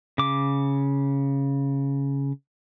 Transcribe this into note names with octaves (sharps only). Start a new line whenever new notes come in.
C#3 D6